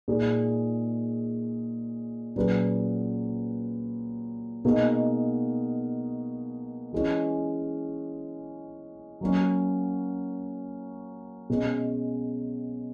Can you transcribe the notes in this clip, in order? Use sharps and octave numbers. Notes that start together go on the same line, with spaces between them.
A#2 G#3 D#4 G#4
A#2 F#3 C#4 G#4 B4
B2 A#3 D#4 G#4
E3 G#3 C#4
F#3 A#3 C#4
B2 G#3 C#4